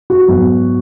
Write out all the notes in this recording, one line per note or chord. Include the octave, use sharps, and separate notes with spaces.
F#4
G#2 F#3 B3